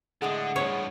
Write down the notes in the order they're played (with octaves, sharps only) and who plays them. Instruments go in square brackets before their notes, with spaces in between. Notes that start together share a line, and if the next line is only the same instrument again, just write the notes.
[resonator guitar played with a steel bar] A2 G#3 G#4 [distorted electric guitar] D3 [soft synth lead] F#5
[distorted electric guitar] G2 F3 [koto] C#5